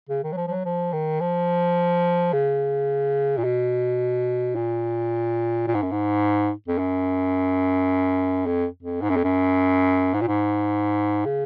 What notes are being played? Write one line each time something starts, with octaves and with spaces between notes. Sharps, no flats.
C#3
D#3
F#3
F3
F3
F#3
F3
D#3
F3
C#3
A#2
B2
A#2
A#2
G#2
F#2
G#2
F2
F#2
F2
F2
G#2
F#2
F2
F#2
G#2
A#2
G#2
C#3